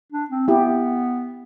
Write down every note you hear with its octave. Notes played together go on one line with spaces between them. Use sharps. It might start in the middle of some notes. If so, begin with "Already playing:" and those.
D4
C4
B3 E4 G4